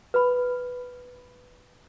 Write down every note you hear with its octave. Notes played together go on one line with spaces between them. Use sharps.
B4 B5